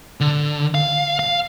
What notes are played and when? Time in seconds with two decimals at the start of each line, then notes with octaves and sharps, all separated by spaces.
0.21 D3
0.75 F5
1.19 F5